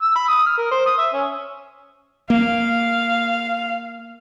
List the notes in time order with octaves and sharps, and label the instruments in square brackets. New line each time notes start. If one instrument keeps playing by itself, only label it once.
[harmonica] E6
B5
D#6
F6
A#4
C5
D#6
E5
C#4
[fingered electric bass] A#3 [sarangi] F5